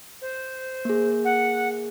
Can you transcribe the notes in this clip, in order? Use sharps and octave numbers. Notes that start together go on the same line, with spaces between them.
C5
A#3 G#4
F#5